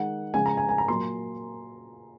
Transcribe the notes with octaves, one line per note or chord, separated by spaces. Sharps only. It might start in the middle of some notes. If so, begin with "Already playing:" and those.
Already playing: D#3 G#3 F#5
C#3 F3 G#3 G#5
A#5
G#5
G#5
A#5
A#2 F#3 A#3 C6